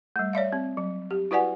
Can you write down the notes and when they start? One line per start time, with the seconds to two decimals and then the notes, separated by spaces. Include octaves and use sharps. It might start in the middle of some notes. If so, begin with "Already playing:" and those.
0.16 G3 A3
0.33 C#5 D5 E5 F5
0.52 C4
0.77 F#3
1.11 G4
1.31 E4 F#4 B4 D5 F#5 G#5